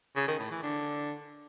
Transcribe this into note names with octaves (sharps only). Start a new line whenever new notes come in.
C#3
D#3
A2
E3
D3